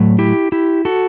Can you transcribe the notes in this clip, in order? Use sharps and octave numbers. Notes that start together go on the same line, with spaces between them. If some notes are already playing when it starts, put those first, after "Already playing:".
Already playing: A2 F#3 A3
E4 G4
E4 G4
F#4 A4